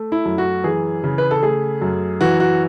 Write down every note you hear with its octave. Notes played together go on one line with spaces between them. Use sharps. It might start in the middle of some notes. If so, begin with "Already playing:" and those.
Already playing: A3
E4
F#2
F#4
E3 G#4
C#3
B4
A4
A3 G#4
F#2
E3 F#4
F#4